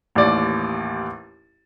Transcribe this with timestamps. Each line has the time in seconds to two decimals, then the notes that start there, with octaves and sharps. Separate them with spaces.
0.15 A1 D#2 D5